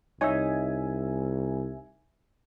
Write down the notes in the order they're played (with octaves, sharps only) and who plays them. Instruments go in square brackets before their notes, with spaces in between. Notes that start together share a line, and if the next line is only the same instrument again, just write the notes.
[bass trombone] C2 [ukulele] D#4 C#5 D#5 [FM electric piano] E5 G#5